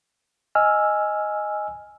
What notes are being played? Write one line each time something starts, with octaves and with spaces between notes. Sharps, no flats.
D#5 G#5 E6 F6